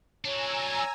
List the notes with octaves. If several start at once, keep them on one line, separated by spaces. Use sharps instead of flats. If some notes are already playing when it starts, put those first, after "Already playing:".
F#3 D4 C#5 G#5 A#5 E6